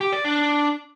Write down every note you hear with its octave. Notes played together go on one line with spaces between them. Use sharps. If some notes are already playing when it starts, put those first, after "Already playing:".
G4
D5
D4